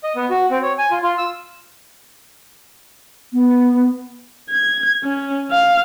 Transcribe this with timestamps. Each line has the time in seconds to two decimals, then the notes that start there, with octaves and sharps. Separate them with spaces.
0.03 D#5
0.16 B3
0.30 F#4
0.51 C4
0.62 C#5
0.78 G#5
0.91 F4
1.03 F4
1.18 E6
3.33 B3
4.50 G#6
5.03 C#4
5.51 F5